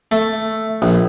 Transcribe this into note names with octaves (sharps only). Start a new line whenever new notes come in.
A3
A#1